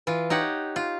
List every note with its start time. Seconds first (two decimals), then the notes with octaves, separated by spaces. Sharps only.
0.07 E3 F4
0.30 D#4 G4 C#5 F#5
0.76 F4